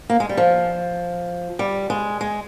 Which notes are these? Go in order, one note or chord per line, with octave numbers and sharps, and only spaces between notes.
A#3
G#3
G3
F3
G3
G#3
G#3